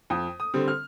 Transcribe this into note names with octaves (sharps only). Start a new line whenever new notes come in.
F2 D#6
D#6
D3 G3 C4
F6